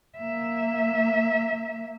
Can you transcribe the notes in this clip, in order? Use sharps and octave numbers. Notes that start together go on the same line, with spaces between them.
A#3 E5